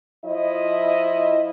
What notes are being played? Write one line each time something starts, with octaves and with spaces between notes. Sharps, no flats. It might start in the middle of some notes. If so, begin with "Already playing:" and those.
F3 E4 D#5